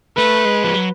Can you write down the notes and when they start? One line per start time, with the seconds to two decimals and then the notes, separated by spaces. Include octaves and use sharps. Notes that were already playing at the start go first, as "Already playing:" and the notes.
0.17 A3 B4
0.45 G#3
0.64 F3
0.74 F#3